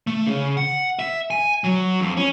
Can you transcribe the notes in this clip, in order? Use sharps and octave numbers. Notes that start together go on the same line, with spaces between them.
A3
C#3
F#5
E5
G#5
F#3
F2
C#4